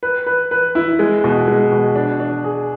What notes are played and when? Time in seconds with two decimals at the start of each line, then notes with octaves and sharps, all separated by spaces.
0.03 B4
0.26 B4
0.51 B4
0.75 E4
0.99 G#3
1.24 B2
1.48 G#3
1.72 B2
1.95 D4
2.20 D4
2.44 G#4